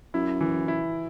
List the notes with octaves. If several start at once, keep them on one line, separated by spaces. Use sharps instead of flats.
F#2 E4
E3
E4